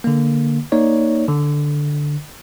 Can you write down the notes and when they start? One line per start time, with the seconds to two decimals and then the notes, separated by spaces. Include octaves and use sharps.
0.04 D3 A#3
0.72 A#3 D#4 C#5 D5
1.28 D3